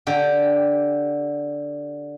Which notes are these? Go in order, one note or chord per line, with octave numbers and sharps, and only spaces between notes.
D3 G4